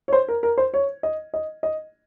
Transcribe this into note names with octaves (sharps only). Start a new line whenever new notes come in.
C#5
C5
A#4
A#4
C5
C#5
D#5
D#5
D#5